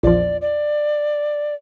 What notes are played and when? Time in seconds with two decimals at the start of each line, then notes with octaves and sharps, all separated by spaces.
0.03 A#1 E2 F3 D5
0.42 D5